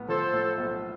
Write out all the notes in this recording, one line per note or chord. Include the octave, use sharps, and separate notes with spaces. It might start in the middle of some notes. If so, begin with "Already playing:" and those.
Already playing: B1 A2 B3
F3 A4 C5
A2
B1